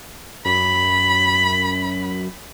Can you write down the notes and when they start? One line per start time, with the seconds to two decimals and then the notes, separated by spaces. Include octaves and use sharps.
0.45 F#2 B5